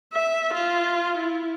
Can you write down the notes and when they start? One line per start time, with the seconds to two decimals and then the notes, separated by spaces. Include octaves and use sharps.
0.13 E5
0.53 F4
1.17 E4